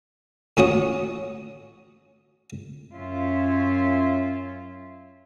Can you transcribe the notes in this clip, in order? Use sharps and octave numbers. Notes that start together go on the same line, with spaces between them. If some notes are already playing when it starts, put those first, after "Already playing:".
A2 C#4 F#4 C#5 D#6
F#2 C#4 F4 E5